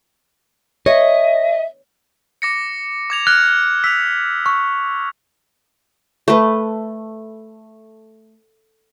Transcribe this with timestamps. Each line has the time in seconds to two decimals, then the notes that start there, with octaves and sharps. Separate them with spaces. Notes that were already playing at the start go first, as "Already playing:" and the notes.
0.86 C#5 D#5 E5
2.42 D6 A#6 C#7
3.10 D6 G#6 F7
3.27 F6 F#6 G#6
3.84 E6 B6 F7
4.46 C#6
6.28 A3 B4